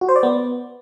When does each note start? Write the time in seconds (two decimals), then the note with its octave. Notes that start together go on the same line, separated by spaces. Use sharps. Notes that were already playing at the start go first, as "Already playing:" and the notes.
0.01 F#4
0.09 C5
0.16 D5
0.23 B3